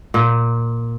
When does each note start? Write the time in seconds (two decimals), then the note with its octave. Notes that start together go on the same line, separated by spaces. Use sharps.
0.14 A#2